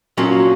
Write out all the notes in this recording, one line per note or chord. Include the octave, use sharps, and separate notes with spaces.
A#2 F#3 A#3 C#4